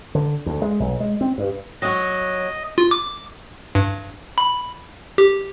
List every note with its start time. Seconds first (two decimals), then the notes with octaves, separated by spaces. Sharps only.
0.15 D3
0.46 D2
0.62 G#3
0.80 B1
1.00 G#3
1.21 C4
1.38 G2
1.82 F#3 F#4 D#5
2.78 F4
2.91 D6
3.75 G2
4.38 B5
5.18 G4